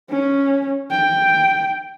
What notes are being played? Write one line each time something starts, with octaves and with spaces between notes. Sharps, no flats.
C#4
G5